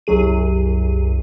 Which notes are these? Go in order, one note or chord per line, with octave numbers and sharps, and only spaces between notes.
C2 F#2 F#3 G#4 D#7